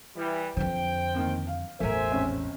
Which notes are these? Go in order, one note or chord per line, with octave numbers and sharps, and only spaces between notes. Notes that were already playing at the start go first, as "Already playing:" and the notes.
E3 G3
F2 D3 C5 G5
D#3 A#3 C4
F5
A1 E2 A3 A#4 C5 E5 G#5
G#1 C4 C#4